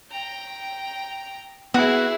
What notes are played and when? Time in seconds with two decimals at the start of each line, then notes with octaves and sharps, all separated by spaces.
0.10 G5 A#5
1.74 B3 E4 F#4 G#4